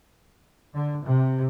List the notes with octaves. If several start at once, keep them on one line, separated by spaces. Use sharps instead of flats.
D3
C3